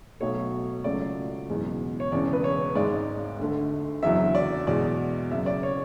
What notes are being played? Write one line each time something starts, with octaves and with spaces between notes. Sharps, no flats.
B1 B2 F#3 A3 C#5
C#2 C#3 F#3 A3 D5
F#1 E2 B2 G#3
C#5
E1 E2 C#3 D5
B4
C#5
G#1 G#2 G#3 D5
D2 D3 A3
F#1 E2 D3 F#3 E5
D5
E2 B2 G#3 D5
F#1 F#2 C#3 E5
D5
C#5